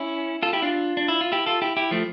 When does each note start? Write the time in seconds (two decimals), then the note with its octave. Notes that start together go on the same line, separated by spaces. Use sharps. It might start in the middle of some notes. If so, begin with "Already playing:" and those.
Already playing: C#4 E4
0.42 F4 A4
0.53 E4 G4
0.62 D4 F4
0.97 D4
1.08 E4
1.21 F4
1.32 E4 G4
1.46 F4 A4
1.62 E4 G4
1.77 E4 G4
1.91 F3 A3